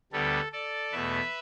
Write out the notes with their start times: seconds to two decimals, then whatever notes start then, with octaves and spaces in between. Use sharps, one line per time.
0.12 D2 D3 G3 B3 A4
0.52 A4 D5
0.92 E2 B2 A3 B4 E5